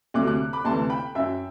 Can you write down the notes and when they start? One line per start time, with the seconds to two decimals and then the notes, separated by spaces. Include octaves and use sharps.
0.14 D2 C3 F#3 D6 F#6
0.27 D6 F#6
0.53 B5 D6
0.65 D2 C3 E3 A5 C6
0.90 G5 B5
1.15 F#2 F#3 E5 G5